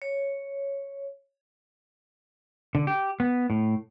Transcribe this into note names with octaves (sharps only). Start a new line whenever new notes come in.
C#5
D3
G4
B3
A2